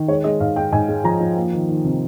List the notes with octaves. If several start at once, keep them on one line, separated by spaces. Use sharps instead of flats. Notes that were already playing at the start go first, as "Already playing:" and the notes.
Already playing: D#3
G#3 C#5
G#3 D#5
G#2 F5
G#3 G5
G#2 G#5
G#3
F3 A#5
F3
A#3
D#3
D#3
C3